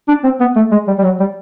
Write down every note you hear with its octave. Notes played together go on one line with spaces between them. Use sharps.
D4
C4
B3
A3
G#3
G3
G3
F#3
G3